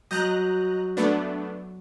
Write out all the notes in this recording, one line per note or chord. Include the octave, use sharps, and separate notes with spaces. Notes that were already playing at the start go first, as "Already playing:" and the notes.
F#3 D#5 A#5 F#6 G6
A3 B3 D4